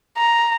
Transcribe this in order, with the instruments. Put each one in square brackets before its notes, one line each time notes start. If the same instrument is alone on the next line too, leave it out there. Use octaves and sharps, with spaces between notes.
[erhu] A#5